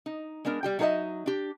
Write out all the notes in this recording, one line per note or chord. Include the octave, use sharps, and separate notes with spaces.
D#4
G#3 B3 D4 A#4
G3 G4 G5
F#3 D#4 G#4 A4 D#5 E5
D4 G4